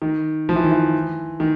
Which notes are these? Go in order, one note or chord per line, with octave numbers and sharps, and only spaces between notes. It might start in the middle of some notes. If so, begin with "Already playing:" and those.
D#3
F3
E3
D#3
E3
D#3